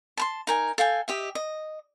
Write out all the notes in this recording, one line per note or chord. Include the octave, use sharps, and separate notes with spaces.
A5 B5 C6
D#4 A#4 G#5
A4 F5 G5 G#5
G4 D#5 E5
D#5